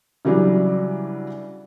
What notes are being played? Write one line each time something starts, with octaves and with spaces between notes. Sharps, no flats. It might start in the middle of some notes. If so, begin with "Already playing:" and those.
C#3 E3 F#3 G3 D4